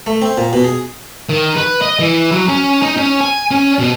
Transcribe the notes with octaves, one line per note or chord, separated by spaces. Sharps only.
A3
C4
A#2
B2
G#4
D#3
B4
D#5
E3
F#3
C#4
D#4
C#4
G#5
C#4
B2